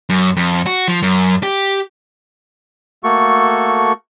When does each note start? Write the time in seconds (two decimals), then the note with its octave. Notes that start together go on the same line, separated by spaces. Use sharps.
0.10 F#2
0.37 F2
0.66 F#4
0.88 F3
1.02 F#2
1.43 G4
3.04 A3 A#3 F#4 A4 C#6